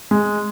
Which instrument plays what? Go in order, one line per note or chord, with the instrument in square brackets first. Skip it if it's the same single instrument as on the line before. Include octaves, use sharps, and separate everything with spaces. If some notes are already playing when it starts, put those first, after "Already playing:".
[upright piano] G#3